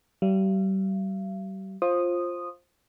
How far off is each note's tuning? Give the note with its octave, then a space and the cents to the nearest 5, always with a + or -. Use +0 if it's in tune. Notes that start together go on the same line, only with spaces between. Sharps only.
G3 -35 F5 -45
F4 +0 C5 +20 D#6 -10